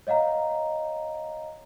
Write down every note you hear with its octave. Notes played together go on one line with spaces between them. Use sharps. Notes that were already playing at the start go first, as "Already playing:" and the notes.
C#5 D#5 F5 F#5 A#5